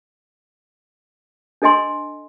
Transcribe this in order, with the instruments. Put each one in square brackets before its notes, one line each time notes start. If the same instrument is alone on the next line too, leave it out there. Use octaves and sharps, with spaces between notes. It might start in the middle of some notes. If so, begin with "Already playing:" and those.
[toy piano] D4 A4 D#5 G#5 C6